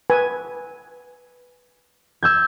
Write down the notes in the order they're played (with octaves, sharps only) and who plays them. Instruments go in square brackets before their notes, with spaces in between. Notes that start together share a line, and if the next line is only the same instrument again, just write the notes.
[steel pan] B4 G#5
[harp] E6 G6 G#6